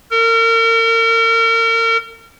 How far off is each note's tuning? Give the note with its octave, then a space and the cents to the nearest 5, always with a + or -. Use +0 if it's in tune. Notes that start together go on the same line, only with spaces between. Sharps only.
A#4 -35